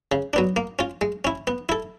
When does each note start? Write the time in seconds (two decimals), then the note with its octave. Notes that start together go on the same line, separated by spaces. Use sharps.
0.12 C#3
0.33 F#3 B3 D4
0.56 A#3
0.79 C#4 F4
1.01 G#3
1.25 C#4 E4
1.47 B3
1.69 E4 A4